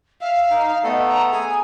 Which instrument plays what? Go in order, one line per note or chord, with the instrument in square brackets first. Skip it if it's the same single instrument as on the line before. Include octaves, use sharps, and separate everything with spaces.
[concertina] E5 [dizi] F5
[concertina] D#4
[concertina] A3 B3 A4 [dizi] D#5
[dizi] A#5
[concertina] G#4 [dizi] G#5